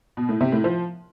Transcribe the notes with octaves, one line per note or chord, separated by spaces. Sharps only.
B2
A2
C3
A2
F3